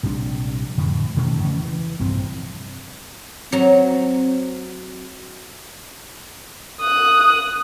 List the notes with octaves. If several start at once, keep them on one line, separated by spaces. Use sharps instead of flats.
A#1 C3 G3 D4
F2 A2 D3 F3
B2 D#3 A3 C#4
E2 C#3
E3
A#1 G2 C3 C4
F#3 C4 A#5
D#6 F#6